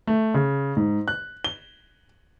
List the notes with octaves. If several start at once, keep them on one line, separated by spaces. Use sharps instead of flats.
A3
C#3
G#2
F#6
G7